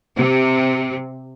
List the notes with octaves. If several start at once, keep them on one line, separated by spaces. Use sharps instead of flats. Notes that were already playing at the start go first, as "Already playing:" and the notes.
C3